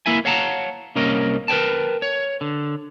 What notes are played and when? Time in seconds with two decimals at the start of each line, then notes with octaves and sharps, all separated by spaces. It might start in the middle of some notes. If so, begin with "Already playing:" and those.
0.06 A#3 E4 E5 G#5
0.25 C#5 F5 F#5 A5 A#5
0.96 C2 A#3 C#4 A#4 D#5
1.48 A#4 B4 C#5 G5 A5
2.02 C#5
2.41 D3